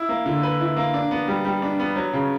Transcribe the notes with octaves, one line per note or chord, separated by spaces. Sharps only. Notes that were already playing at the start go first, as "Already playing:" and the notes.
Already playing: E4
A#3
D3
B4
E4
A#3
D4
B3
G3
G3
D4
B3
F#3
C#3